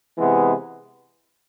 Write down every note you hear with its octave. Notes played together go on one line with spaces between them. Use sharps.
C3 E3 G#3 B3